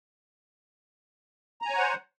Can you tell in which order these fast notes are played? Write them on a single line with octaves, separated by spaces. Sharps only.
A#5 G#5 C#5 F#5 C5